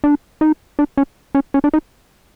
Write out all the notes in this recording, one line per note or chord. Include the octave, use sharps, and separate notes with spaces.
D4
D#4
D4
C#4
C#4
C#4
D4
D#4